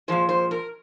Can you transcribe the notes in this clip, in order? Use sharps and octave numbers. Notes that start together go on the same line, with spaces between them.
A#2 F3 G#3 C5
C5
A#4